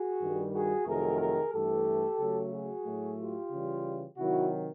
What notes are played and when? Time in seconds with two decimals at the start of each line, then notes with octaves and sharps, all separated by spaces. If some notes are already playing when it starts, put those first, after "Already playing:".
Already playing: F#4 G#4
0.20 G2 D#3 G3
0.53 F#4 G#4
0.86 F2 C3 D#3 F#3 A3 G#4 A#4
1.19 G#4 A#4
1.53 G2 E3 A3 G4 A4
2.19 C#3 F#3 A3
2.52 F#4 G#4
2.85 A2 F#3 A3
3.18 F4 G4
3.51 C#3 E3 G3
4.17 C3 D#3 F#3 E4 F#4